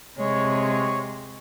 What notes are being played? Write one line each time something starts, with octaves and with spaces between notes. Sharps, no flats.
C3 G#3 C#5